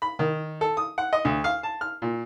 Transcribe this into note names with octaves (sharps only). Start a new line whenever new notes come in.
B5
D#3
A4
D#6
F#5
D#5
D2
F5
A5
F6
A#2